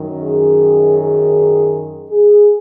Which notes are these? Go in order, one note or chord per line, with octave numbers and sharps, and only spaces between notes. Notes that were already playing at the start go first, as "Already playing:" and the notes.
Already playing: F#2 D#3
G#4
G#4
G#4